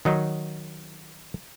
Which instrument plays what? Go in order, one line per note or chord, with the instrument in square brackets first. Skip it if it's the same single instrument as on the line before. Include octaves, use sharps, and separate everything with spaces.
[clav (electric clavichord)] D#3 F#3 D#4